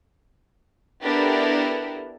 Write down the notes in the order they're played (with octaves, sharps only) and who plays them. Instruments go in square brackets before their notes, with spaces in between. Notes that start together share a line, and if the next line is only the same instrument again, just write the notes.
[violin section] B3 D4 E4 G4 A4 A#4